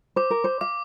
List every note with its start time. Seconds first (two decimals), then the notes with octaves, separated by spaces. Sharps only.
0.16 C5 D6
0.30 A#4
0.44 C5
0.61 F5 D6